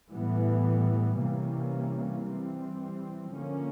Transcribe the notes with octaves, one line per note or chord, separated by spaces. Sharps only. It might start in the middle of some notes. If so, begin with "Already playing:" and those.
A2 E3 G3 B3
C3 E3 G3 A#3 C#4
E3 G3 C4
D3 F3 A#3 C#4